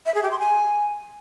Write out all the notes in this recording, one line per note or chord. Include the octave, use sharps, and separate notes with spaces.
E5
G#4
G4
C6
G#5